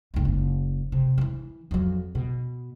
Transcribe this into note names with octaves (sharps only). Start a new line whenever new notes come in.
F1 C#2
F#1
C3
E3 F3
F2 F#3
B2